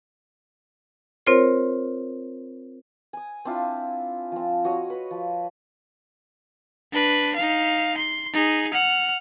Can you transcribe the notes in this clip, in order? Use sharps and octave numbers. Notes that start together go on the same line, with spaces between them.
C4 F4 A#4 C5 C#5
G#5 D#6
C4 D4 E4 F4
F3 C4
F#4 C#5 D#5
B4
F3
D4 B4
D#4 F5
C6
D#4 G#4
F#5 F6